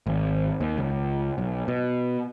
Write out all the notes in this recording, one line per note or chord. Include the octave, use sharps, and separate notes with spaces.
G#1
D#2
C#2
B1
B2